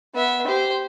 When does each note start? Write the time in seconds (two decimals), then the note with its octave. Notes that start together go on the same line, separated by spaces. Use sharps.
0.15 B3 E5
0.47 G4 C5